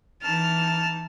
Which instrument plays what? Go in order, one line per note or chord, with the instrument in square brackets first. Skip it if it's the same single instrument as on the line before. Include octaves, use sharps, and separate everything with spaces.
[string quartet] E3 D#4 [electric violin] A5 F6